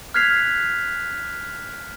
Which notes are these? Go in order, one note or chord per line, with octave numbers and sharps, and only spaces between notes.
F6 F#6 G#6 B6 C7 F7